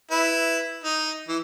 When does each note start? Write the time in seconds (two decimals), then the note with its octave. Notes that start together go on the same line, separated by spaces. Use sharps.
0.11 E4 B4
0.84 D#4
1.28 E3